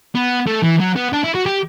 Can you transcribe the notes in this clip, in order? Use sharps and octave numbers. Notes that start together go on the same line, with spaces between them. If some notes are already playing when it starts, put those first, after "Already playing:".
B3
A3
E3
F#3
B3
D4
E4
F#4
G4